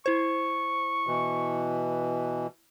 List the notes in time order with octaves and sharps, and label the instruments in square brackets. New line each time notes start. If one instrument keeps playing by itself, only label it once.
[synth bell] E4 C5 [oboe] C#6
[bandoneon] B2 E3